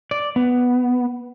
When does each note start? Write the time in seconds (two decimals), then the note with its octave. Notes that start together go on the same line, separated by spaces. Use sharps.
0.11 D5
0.36 B3